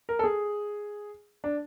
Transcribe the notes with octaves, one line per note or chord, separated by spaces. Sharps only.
A#4
A4
G#4
D4